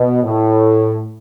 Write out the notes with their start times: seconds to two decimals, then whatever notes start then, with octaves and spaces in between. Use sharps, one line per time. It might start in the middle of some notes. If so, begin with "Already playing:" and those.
Already playing: B2
0.23 A2